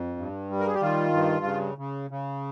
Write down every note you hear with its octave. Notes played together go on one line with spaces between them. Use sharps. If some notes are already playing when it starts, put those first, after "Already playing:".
Already playing: F2
G2
G3
A#4
G#4
G4
D#3 F4
G2
C#3
C#3
C#3